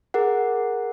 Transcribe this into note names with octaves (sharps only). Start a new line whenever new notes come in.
G#4 A#4 F#5